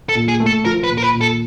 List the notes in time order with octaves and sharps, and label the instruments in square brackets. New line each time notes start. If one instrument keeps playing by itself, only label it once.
[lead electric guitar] A4
[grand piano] A#2
[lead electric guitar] G#4
[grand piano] A3
[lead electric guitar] A4
[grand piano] F3 [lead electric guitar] A#4
[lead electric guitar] B4
[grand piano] A#2
[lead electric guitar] A#4
B4
[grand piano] A#2
[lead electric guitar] A4